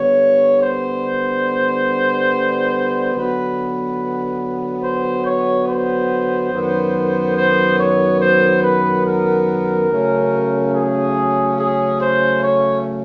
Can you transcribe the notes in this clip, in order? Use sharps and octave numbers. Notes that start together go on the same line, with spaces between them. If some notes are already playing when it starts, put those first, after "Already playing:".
Already playing: D3 G3 B3 C#5
C5
D3 F#3 B3 B4
C5
C#5
C5
F#2 D#3 F#3 B3
C5
C#5
C5
B4
A#4
C#3 F#3 A3 C#4
G#4
G#4
C5
C#5